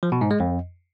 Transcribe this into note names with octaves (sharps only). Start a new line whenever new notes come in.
F3
B2
G#2
G#3
F2